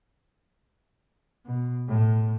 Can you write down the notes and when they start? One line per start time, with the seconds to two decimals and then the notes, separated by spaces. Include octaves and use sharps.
1.45 B2
1.88 A2